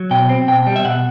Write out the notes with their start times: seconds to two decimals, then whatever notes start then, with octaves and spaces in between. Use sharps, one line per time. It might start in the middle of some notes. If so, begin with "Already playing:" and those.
Already playing: F#3
0.11 B2 G5
0.29 C4
0.48 B2 G5
0.67 G3
0.76 E5
0.85 B2 F#5